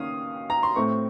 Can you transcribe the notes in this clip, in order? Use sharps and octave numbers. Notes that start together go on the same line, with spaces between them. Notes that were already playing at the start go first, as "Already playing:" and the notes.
Already playing: D#3 A#3 C#4 F5 D#6
A#5
C6
A2 A3 C4 C#6